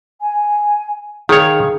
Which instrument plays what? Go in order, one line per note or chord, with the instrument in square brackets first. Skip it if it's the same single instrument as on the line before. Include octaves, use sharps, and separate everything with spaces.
[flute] G#5
[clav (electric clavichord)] D#3 C#5 [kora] G#4 [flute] F5